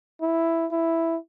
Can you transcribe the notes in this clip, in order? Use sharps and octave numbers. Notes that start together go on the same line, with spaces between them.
E4
E4